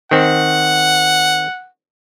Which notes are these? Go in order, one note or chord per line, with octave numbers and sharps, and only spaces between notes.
D#3 C4 F#5